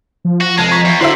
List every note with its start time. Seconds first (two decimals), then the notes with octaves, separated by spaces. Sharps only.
0.25 F3
0.41 F#4 A#6
0.57 F1 G#3 A5 G#6
0.71 A#5 C#6 B6
0.85 E2
1.01 D3 E4 F#4 C5 E5 C6 C7 F#7